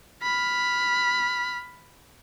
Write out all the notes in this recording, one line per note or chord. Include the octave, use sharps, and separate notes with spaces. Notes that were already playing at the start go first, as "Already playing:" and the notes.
B5 F6